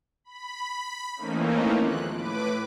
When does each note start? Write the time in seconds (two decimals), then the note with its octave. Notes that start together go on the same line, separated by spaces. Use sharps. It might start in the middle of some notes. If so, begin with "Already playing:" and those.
0.24 B5
1.16 E3 A3 A#3 C4 C#4 D#4
1.78 D#2 F3 G#3 F#6
2.11 A2 B4 D6